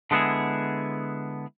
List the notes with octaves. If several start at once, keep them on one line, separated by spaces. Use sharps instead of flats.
D3 G#3 B3 E4 G#4